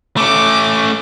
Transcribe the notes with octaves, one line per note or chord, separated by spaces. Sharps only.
A3 C#4 D6